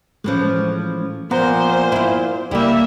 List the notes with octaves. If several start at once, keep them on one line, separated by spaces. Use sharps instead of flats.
A2 E3 F3 G#3 C#4
A#2 F3 B3 C5 F#5 A#5
E4 F4
C#2 G3 A#3 E4 G4 E5